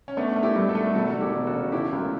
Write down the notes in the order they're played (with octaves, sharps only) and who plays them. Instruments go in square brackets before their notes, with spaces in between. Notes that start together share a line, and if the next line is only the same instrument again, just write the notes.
[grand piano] C#4
[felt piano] A3 [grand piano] B3 D4
[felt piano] A3
[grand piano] E4 G4
[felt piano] G2
[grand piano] F#4 A4
[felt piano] A3
[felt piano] E1 [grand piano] F#4 A4
[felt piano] E1
[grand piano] E4 G4
[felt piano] E1
[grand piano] F#4 A4
[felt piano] C#3
[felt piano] E3 [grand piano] E4 G4
[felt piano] C#2
[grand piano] F#3 A3